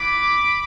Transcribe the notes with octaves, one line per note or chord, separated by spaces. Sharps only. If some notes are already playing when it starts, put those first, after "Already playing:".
Already playing: B3 E4 B5 D6